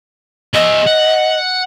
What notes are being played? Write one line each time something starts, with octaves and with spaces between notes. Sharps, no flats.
G#4 D#5 E5
F#5